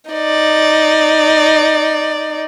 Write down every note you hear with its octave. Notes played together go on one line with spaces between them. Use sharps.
D#4 D5